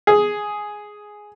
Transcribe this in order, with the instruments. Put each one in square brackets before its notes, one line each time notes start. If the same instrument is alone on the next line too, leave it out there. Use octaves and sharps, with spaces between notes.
[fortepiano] G#4